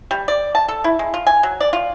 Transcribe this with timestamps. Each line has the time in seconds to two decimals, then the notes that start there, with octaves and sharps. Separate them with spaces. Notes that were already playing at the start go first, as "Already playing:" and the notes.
0.11 G3
0.28 D5
0.55 A5
0.68 A4
0.84 E4
0.99 G#3
1.14 F4
1.27 G#5
1.43 F#3
1.61 D5
1.73 F4